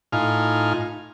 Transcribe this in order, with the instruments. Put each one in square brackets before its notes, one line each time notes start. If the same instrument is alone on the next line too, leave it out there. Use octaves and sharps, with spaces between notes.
[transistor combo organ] A2 D#4 F4 G#5 F6